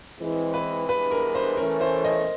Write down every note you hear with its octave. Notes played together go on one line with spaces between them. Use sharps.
E3 G#3 C4
B4
G2 E3 G#3 B3 D4 B4
A#4
C5
E3 A3 C#4 A#4
C5
D#5